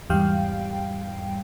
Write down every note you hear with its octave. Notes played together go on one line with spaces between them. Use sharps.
E2 G#2 G3 F5 G5